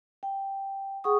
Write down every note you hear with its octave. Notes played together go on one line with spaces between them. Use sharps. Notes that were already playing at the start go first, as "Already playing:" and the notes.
G5
G#4 F#5 G5 C#6 D#6